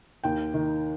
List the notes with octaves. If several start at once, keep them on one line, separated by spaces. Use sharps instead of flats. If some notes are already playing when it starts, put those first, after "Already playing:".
D#2 G5
D#3